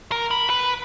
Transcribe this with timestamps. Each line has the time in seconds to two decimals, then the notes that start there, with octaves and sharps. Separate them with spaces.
0.12 A#4
0.31 B5
0.50 B4